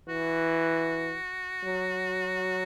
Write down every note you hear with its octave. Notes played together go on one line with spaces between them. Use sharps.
E3 F#4
F#3